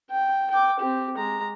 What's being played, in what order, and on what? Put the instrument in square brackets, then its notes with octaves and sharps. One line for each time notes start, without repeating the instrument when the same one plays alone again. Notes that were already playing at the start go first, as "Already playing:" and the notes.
[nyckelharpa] G5
G5 D6
C4 G4
G#3 A#5